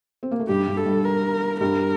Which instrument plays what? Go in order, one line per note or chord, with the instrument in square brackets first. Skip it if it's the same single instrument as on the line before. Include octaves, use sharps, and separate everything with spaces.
[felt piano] C4
A#3
A3
[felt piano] G2 G3 [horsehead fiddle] G4
[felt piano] G2 G3
[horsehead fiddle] A4
[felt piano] G2 G3
[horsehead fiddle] A#4
[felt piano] G2 G3 [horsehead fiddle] A#4